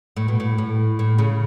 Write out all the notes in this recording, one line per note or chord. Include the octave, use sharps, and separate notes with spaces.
A2
B2
A2
A2
A2
C#3